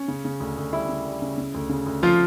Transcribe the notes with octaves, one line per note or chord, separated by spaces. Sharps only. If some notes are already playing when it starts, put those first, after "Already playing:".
Already playing: C#4
C#3
C#3
D2
D2
G3 E4
C#3
G3
C#3
C#3
D2
C#3
D2
F3 F4